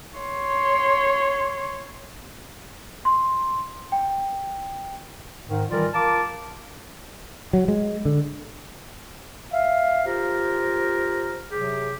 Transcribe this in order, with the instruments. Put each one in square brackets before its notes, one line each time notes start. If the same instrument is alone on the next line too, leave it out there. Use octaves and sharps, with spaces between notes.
[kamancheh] C#5 C6
[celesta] C6
G5
[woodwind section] G#2 D#3
D#3 E3 G3 F4 A#4 D5
F4 A#4 F5 A5 D6
[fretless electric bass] F#3
G#3
D3
[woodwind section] E5 F5
F4 G4 A#4 C5
C3 F#3 G4 G#4